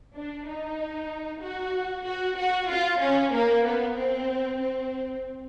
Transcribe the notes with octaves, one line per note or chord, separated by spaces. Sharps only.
D4
D#4
F#4
F#4
F#4
F4
C#4
A#3
B3
C4
C4